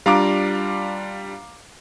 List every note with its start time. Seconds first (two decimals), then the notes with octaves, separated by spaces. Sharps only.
0.06 G3 D4 F4 F5 A#5 D6